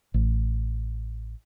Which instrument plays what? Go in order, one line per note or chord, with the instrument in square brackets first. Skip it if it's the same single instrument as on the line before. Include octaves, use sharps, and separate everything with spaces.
[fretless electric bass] A1